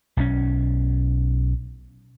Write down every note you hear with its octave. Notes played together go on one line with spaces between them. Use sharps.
B1 F3 C#4